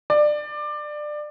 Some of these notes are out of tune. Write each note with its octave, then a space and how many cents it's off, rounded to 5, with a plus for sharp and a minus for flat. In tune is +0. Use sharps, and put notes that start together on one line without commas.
D5 +20